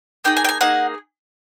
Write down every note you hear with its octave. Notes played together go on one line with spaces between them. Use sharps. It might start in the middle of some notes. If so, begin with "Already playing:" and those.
A#3 D#4 G#4 G5
G#5
G5
G#5
A#3 D#4 G#4 F#5